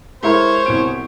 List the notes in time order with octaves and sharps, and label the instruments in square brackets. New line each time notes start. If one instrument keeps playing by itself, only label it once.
[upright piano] G#3 E4 A#4 [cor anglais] C5 [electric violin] C#5
[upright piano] C2 B2 D7